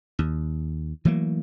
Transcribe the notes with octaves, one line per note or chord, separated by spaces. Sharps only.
D#2
E3 F#3 A3 A#3